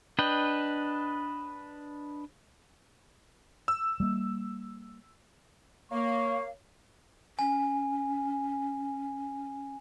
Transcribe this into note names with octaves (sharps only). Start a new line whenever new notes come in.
D4 B4 D#5 G5
E6
G3 A#3
A#3 C#5 F5 C#6
C#4 G#5